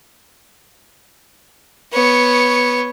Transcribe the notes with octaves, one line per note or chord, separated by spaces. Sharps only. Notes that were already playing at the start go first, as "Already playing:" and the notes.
B3 C#5